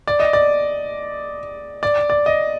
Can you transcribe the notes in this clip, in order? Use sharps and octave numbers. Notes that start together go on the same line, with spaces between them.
D5
D#5
D5
D5
D5
D#5